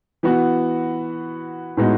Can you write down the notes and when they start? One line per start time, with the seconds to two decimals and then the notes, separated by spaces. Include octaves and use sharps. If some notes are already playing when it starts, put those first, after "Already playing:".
0.23 E3 B3 F#4
1.77 A2 G#3 B3 D#4 F#4